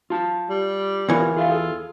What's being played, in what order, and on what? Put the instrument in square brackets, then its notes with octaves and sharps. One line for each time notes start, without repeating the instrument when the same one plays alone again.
[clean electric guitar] F4 A5
[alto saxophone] G3
[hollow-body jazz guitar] E2 E3 C#5 [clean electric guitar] B3 F4 A#4
[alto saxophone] F4 [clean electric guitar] G#4 E5 F5
[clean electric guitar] G#4 A4